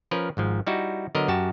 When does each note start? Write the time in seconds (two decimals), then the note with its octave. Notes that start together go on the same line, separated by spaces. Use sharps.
0.11 F3 C#4 A#4 B4
0.37 G#1 G#2 F3
0.67 G3 D#4 E4 F#4
1.15 D3 F#3 B3 A#4 D#5
1.28 F#2 F#4 G4 A5